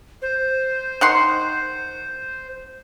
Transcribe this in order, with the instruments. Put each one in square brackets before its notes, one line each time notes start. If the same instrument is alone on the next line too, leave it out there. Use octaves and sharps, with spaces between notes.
[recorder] C5
[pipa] D#3 F#5 C6